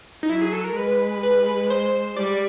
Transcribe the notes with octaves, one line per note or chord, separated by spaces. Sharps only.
D#4
F#3 E4
G#4
A4
A#4
G#3 B4
B4
B4
C5
G3 D5